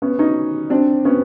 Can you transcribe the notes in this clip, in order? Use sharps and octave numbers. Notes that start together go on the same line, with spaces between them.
B3 C#4
C#4 D#4
C4 D4
B3 C#4